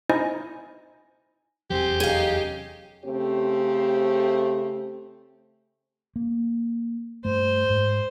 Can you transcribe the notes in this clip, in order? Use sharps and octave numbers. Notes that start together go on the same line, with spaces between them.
D#4 E4 C5 D#5 G#5
F1 E2 F#3 C4 G4 G#4
C#4 D#4 G#4 F5
C#3 A3 C4 G4 C5
A#3
G2 A3 C5
G#2